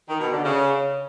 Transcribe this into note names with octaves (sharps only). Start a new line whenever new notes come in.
D#3
B2
D3
C#3